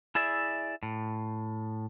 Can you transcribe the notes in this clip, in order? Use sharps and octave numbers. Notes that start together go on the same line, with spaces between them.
E4 G#4 D5 E5
A2